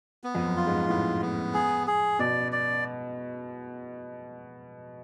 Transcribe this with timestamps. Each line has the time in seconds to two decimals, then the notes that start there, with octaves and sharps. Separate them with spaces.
0.24 B3
0.35 F2
0.45 F#2
0.57 F4
0.67 G#2
0.89 A2 B3
1.22 B3
1.54 G#4
1.87 G#4
2.19 B2 D5
2.52 D5